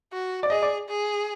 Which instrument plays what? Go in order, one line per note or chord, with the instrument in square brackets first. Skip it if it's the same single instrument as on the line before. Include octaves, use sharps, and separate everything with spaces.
[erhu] F#4
[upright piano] D5
[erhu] G#4 [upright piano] D#5
[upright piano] D5
[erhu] G#4